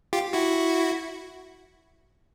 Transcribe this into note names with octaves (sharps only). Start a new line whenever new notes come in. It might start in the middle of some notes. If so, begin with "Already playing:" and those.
F4 G4
E4 F#4